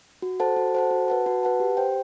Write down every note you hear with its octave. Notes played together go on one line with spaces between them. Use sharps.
F#4
A4 C5 F#5 A5
F#4
A4 C5 F#5 A5
F#4
B4 F#5 A5
F#4
B4 F#5 A5
G4
C5 G5